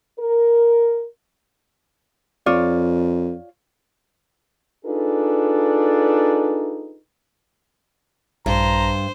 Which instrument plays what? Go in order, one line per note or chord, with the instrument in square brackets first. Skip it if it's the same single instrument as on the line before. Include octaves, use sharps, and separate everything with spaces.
[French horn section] A#4
[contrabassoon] F2 [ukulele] F4 C#5 D5
[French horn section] D4 D#4 F4 G#4 A4 B4
[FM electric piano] A#1 [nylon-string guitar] G2 [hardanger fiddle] C5 [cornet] A#5